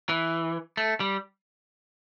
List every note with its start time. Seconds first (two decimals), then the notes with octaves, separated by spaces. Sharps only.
0.09 E3
0.77 A3
1.00 G3